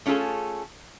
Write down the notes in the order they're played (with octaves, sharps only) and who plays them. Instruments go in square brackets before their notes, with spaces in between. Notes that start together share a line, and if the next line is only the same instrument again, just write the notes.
[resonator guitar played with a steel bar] A3 C#4 F4 G#4 A4